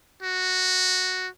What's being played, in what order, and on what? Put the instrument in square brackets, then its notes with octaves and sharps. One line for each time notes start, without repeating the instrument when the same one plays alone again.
[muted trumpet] F#4